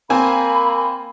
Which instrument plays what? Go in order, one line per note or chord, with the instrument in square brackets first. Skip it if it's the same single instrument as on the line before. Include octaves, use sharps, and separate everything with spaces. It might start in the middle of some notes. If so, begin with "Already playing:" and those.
[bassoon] A#3 [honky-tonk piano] C4 G#5 [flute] B5